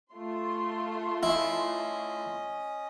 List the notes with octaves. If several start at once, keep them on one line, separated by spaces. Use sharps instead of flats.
A3 F4 C6
C#4 E4 D#5